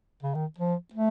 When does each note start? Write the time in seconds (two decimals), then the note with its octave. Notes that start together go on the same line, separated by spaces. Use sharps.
0.23 C#3
0.35 D#3
0.58 F3
0.94 A3